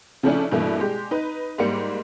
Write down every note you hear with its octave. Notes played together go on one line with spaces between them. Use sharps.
C#3 F3 A3 C#4 D4 E4
G2 B2 E3 A3 A#3 E4
G#3 G4
D#4 B4
G#2 G3 A#3 C#7